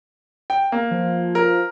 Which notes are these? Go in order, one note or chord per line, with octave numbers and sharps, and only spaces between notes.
G5
A#3
F3
A#4